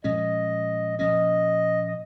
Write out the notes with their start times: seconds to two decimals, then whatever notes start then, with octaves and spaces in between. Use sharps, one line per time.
0.04 A#2 F3 G#3 C#4 D#5
0.99 A#2 F3 A#3 C#4 D#5
1.87 D#5